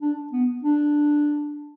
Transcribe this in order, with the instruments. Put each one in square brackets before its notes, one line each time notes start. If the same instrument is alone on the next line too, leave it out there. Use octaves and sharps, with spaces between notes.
[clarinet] D4
B3
D4